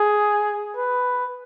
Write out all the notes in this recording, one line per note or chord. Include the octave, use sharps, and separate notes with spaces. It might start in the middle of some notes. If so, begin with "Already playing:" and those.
Already playing: G#4
B4